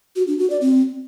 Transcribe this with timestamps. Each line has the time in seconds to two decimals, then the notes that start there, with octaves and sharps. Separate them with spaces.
0.16 F#4
0.27 D4
0.38 F#4
0.50 D5
0.61 C4